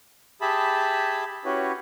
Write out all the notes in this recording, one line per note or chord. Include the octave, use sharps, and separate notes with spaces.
G4 G#4 E5 A5 B5
C#4 E4 F#4 G4 B4 C#5